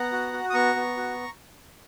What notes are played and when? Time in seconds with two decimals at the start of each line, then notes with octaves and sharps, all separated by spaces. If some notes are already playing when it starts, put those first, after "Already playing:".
Already playing: B3 F#5 A#5
0.12 F#4
0.33 F#4
0.50 D#6
0.54 B3 A#5 C#6
0.76 B3
0.97 F#4